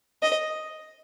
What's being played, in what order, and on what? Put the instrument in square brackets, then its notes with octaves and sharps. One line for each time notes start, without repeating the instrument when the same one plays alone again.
[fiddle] D#5